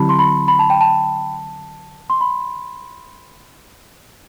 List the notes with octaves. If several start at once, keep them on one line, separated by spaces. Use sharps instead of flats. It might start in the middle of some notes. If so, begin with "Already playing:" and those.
Already playing: D3 F#3 C4 E4 G4 A5 B5
C6
B5
B5
A5
G5
A5
C6
B5